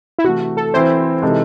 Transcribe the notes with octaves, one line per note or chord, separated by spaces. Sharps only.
E4
C3 E3 A3 F#4
A4
E3 C4 E4 C5
C3 E3 G#3 D#4 A4